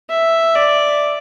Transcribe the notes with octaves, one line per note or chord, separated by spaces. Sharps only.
E5
D5